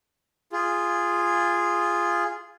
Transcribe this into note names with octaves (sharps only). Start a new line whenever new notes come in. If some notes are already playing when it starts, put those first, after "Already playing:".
F4 G#4